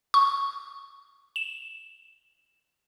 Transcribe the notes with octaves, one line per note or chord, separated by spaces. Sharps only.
C#6
E7